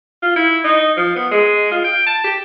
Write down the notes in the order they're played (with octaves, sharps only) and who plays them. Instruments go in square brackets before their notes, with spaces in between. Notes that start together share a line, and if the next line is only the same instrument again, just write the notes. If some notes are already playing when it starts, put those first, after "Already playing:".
[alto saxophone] F4
E4
D#4
F3
B3
G#3
F4
G5
A5
G4